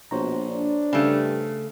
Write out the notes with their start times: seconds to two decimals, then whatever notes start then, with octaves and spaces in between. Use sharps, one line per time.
0.11 A#1 B2 C5 C#5 A#5
0.48 D4
0.93 G2 C#3 A3